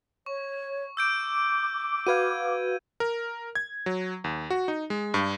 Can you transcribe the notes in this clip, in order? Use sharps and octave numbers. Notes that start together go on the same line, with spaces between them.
C#5 C#6
D6 E6 G6 D7
F#4 B4 F5 G#6 D#7
A#4
G#6
F#3
D#2
F#4
D#4
G#3
G2